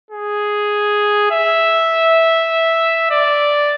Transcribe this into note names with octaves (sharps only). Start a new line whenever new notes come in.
G#4
E5
D5